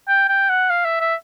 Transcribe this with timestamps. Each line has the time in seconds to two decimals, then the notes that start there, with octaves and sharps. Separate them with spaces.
0.08 G5
0.29 G5
0.50 F#5
0.70 F5
0.85 E5
1.01 E5